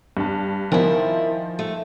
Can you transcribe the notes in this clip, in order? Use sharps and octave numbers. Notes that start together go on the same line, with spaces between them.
G2 A5
D#3 F3 E4 A#4 G#5
A3